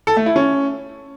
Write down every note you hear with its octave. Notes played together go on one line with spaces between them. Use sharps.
A4
A3
E4
C#4